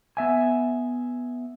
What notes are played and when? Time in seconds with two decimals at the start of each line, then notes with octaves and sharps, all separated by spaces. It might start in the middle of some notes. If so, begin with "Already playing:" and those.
0.17 B3 E5 G#5